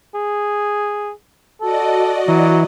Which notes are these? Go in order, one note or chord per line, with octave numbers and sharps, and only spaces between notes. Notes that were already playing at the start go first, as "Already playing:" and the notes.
G#4
F#4 A4 D5 D#5
E3 F#3